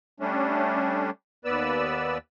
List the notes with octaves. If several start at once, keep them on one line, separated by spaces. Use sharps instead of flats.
G3 A3 C#4 D4
D#2 B3 B4 D5 E6